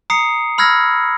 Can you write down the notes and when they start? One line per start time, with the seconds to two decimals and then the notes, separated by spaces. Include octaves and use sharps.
0.10 A#5 D#6 C7 C#7
0.58 B5 E6 F6 G#6 A#6